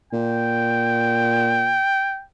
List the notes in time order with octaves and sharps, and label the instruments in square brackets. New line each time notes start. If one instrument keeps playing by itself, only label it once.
[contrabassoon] A#2 [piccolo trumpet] G5